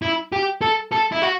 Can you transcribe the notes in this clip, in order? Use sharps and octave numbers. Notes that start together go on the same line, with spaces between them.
E4
G4
A4
A4
E4
F#4